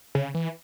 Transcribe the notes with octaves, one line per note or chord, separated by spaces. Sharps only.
C#3
E3